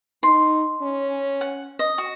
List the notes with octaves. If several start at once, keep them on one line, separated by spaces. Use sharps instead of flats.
D#4 C6
C#4
F#5
D#5
F#4